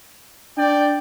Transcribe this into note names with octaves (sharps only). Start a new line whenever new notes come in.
D4 D5 G5